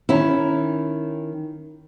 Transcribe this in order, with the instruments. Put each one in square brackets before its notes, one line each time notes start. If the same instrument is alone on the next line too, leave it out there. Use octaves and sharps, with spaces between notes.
[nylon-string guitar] D#3 C#4 E4